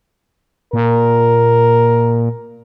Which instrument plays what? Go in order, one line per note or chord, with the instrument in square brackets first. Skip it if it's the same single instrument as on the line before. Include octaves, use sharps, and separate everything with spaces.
[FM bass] A#2 [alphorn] A#4